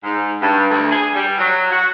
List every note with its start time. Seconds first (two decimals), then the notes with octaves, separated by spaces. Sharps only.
0.03 G#2
0.42 G2
0.70 D2
0.91 G#4
1.14 G3
1.38 F#3
1.71 F#4